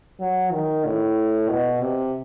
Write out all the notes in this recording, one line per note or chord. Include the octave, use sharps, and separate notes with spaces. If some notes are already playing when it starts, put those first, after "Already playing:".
F#3
D#3
A2
B2
C3